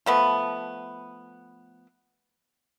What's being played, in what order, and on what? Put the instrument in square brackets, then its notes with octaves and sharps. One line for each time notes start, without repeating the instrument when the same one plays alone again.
[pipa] F3 A3 B3